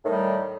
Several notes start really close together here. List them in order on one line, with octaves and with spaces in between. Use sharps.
A2 D#3 G3